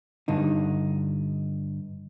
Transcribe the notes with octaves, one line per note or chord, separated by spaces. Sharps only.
G2 D3 D#4